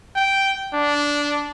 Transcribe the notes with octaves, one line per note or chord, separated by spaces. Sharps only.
G5
D4